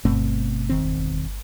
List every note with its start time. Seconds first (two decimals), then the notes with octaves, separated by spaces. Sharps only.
0.05 G1 B2 A3 C4
0.69 E1 D#3 C4